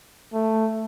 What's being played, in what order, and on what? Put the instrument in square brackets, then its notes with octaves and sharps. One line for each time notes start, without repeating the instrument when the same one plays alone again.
[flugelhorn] A3